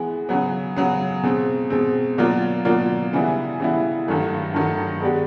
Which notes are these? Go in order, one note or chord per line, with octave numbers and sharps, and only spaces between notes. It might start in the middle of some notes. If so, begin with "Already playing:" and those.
Already playing: E3 G#3 B3
C#3 F#3 B3
C#3 F#3 B3
B2 G#3 C4
B2 G#3 C4
B2 F#3 A#3 D4 F4
B2 F#3 A#3 D4 F4
C#3 E3 G3 B3 E4
C#3 E3 G3 B3 E4
G2 D#3 F#3 A3
G2 D#3 F#3 A3
G#3 B3 D4 G4